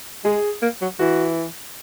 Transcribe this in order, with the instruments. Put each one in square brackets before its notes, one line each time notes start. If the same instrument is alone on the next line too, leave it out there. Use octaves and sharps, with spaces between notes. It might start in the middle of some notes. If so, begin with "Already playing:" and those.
[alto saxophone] G#3 [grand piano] G#4
[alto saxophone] A#3
F#3
[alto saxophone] E3 [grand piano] F#4